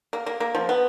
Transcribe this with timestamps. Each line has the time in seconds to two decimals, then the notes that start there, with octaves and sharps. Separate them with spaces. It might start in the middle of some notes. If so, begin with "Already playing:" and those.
0.13 A#3
0.26 A#3
0.40 A#3
0.55 F3
0.69 B3